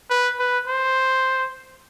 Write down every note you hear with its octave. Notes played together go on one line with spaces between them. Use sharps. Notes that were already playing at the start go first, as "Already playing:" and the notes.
B4
B4
C5